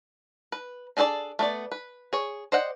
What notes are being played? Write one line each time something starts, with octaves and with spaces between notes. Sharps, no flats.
B4
D4 G#4 A4 C5 D5
A3 B3 D5
B4
G#4 C#5
C5 D5 D#5 F#5 G5